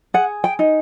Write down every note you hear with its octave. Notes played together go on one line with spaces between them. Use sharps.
G#4 F#5
G5
D#4